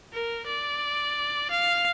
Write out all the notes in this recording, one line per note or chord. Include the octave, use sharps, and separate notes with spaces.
A#4
D5
F5